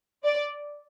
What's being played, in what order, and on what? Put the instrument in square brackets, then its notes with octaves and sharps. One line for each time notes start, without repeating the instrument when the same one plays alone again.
[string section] D5